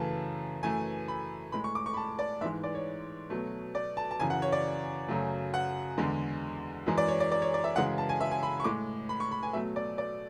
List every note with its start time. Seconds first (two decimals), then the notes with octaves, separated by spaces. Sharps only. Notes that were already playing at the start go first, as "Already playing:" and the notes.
Already playing: F#2 C#3 E3 A3 A5
0.63 F#2 E3 A3 G#5
1.08 B5
1.52 A2 G#3 B5
1.64 C#6
1.75 D6
1.86 C#6
1.93 B5
1.97 A5
2.19 D5
2.41 G#2 E5
2.44 E3 G#3
2.63 D5
2.75 C#5
3.30 B2 F#3 A3
3.75 D5
3.97 A5
4.11 A5
4.20 F#2 C#3 E3 G#5
4.30 F#5
4.42 C#5
4.52 D5
5.08 F#2 C#3 F#3 A3
5.54 F#5
5.98 E2 D3 G#3
6.86 F#2 E3 G#3
6.98 D5
7.08 C#5
7.20 D5
7.32 D5
7.42 C#5
7.54 D5
7.64 E5
7.76 F#2 C#3 E3 G#3 F#5
7.98 A5
8.09 G#5
8.20 E5
8.31 G#5
8.43 B5
8.60 C#6
8.64 A2 G#3 D6
9.09 B5
9.20 C#6
9.31 B5
9.43 G#5
9.53 B2 F#3 A3 E5
9.76 D5
9.98 D5